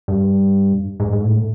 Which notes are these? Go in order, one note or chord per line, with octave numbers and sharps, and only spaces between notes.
G2
G#2
G#2
A2